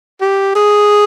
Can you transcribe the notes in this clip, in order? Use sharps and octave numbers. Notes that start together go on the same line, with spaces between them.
G4
G#4